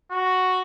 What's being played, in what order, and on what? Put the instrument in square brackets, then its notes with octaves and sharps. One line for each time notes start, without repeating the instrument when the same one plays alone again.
[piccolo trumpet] F#4